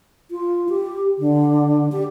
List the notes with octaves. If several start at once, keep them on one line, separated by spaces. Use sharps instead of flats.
F4
G4
D3
G4